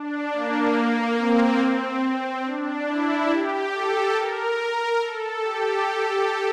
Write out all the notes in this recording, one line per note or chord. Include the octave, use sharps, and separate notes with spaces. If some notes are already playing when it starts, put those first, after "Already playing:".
Already playing: D4
A#3
A#3
C4
C4
C4
D4
E4
G4
A4
A#4
A#4
A4
G4